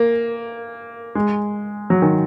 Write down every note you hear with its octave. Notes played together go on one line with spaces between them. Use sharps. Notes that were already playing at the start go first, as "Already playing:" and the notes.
Already playing: A#3
G#3
F#3
D#3